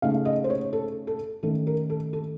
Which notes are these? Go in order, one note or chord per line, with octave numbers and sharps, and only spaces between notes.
C#3 A3 D#4 F5
D#5
C5
C#5
A4
A4
D#3 A3 C#4 A4
A#4
A4
A4